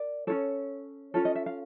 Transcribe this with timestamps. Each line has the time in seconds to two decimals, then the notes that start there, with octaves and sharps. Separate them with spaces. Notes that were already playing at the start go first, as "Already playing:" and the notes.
Already playing: A#4 D5
0.27 C#4 F4 A4 C#5
1.14 C#4 F4 A4 C#5
1.25 D#5
1.35 E5
1.46 F5